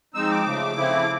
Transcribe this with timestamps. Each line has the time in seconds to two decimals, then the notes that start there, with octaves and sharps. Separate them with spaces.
0.14 F3 G#3 C4 D#4 E6
0.31 D6
0.46 C#3 F3 A3
0.76 C#3 F3 A3 C4 E4